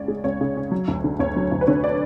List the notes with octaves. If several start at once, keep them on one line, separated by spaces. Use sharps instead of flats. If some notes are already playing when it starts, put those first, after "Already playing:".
Already playing: C#2 C#4 C#5 D5
G#3
C#2 C#5
C#3
C#4
F#3
D2
D3
D2 C#5
F#3
D2
B4
D3 C#5
D5